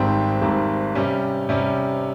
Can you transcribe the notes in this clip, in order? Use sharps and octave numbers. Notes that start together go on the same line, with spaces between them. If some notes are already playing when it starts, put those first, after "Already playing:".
Already playing: G#1 G#2 G3 C4
G#1 G#2 G3 C4
C3 G3 C#4
C3 G3 C#4